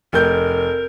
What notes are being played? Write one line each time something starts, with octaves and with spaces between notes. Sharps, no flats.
F1 A#4 G6